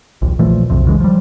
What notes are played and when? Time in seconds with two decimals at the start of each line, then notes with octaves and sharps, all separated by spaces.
0.22 A#1 D#2
0.39 A#2 E3 F3 A3
0.70 B1 F2 C3
0.86 C#3 E3 G#3
1.00 F3 G3